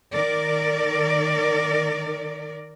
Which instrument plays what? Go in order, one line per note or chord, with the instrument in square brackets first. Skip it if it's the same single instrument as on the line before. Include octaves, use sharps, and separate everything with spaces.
[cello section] D#3 A#4 D5